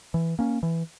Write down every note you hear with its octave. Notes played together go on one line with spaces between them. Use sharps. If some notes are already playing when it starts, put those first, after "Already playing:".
E3
A#3 C#4
E3